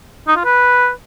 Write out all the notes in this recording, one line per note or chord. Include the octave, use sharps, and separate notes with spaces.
D#4
F4
B4